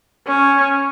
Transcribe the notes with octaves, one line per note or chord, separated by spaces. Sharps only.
C#4